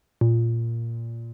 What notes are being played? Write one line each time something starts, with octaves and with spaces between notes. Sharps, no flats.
A#2